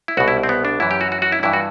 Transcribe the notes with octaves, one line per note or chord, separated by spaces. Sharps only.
E4
C2 B2 F#4
E4
C4
B3
D4
F#2 E3 E4
G4
F#4
F#4
F#4
E4
G2 E3 E4
F#4